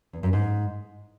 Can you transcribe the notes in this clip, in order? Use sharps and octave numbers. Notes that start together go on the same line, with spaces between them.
E2
F#2
G#2